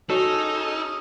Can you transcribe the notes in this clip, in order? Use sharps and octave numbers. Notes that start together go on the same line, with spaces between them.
C#4 D#4 F#4 G#4 A4 C#5 C#6